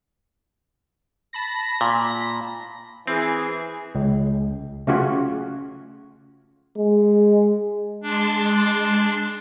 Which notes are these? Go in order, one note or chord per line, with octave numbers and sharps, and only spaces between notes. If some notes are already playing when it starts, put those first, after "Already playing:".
A5 B5 A#6
A#2
E3 C4 G#4
C#2
C#3 A3 C#4 F4 F#4
G#3
G#3 D4 A5 C6